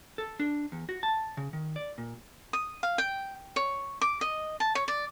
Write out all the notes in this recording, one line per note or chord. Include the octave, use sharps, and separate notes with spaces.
A4
D4
E2
F#4
A5
C#3
D#3
D5
A#2
D#6
F5
G5
C#5
D6
D#5
A5
C#5
D5